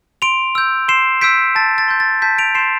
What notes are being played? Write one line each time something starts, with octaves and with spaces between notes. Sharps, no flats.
C6 D7 F7
E6 G6
C6 C7 E7
E6 G6 B6 D7
A5 A6
A6
C6 G6
A6
A5 G6 B6
D7 F7
C6 G6 C7 E7